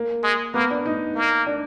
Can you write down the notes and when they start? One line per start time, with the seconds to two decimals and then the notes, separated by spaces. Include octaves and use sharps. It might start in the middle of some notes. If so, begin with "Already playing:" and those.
Already playing: A#3
0.24 G#3
0.54 A#3 B3
0.70 D4
0.86 D#4
1.15 A#3
1.46 D4